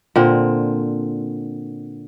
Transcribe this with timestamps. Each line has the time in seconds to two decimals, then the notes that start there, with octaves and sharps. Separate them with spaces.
0.16 A#2 D3 C4